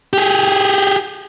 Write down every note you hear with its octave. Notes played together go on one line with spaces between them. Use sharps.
G4 G#4